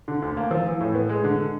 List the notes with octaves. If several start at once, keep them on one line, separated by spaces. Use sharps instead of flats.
D3
D2
A#3
F3
E3
A2
B3
G#3
D3